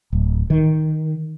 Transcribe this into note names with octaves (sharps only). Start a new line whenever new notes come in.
D1
D#3